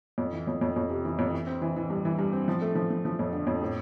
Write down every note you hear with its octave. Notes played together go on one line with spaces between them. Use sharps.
F2
E3
F2
F2
F2
C3
E3
F2
E3
C4
E3
E3
G2
E3
G2
C4
F3
A3
F3
F3
F3
F2
D3
F2
A2